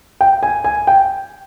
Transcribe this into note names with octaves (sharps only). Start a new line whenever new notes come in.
G5
G#5
G#5
G5